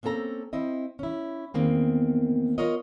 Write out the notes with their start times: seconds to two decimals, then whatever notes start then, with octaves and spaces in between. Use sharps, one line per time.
0.03 A#3 C4 C#4 A4 A#5
0.53 C4 E4 D#5
0.99 C#4 E4
1.54 E2 D#3 A#3 C4
2.58 F4 A#4 C#5 D#5